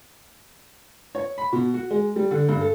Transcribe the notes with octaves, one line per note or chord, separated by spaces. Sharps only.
C#5
B5
B2
F#4
G#3
G3
D3
G2
A4